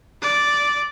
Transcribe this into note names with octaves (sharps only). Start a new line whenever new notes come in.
D5